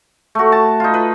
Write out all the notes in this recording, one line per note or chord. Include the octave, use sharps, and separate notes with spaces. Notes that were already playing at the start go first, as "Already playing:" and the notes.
A3 F#4
A5
D#4 F4
B4